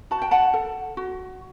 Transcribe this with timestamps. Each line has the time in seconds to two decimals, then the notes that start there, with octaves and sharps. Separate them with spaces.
0.11 F#4 A5
0.22 G5
0.31 F#5 A5
0.54 A4
0.97 F#4